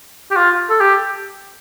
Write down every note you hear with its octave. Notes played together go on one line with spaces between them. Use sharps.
G4
F4
A4
G4